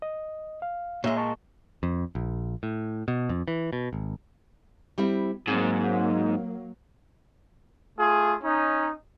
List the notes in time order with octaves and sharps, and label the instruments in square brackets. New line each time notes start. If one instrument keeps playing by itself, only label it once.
[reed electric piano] D#5
F5
[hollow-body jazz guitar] A#2 G#3 [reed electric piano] C#5 E5
[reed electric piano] D#5 A5 C#6
[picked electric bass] F2
A#1
A2
B2
F2
E3
B2
G#1
[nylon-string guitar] G3 C4 E4
[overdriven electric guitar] G#2 [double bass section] F#3 A#3 [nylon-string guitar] C4
[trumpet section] A3 F4 G#4
C#4 D#4